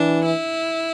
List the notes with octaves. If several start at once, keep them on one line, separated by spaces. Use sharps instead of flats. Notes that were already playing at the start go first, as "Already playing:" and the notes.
Already playing: E3 D4
E4